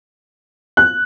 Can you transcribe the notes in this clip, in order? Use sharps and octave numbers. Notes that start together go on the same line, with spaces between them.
F#6